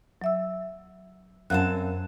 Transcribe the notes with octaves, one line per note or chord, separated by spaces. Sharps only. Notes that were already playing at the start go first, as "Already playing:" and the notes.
F#3 E5 E6
F#2 C4 F5 F#5 A5 F#6